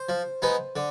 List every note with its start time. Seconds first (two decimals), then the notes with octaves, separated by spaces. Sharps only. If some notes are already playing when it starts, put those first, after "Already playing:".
Already playing: C5
0.09 F3
0.42 G#3 B3 D#4
0.76 D3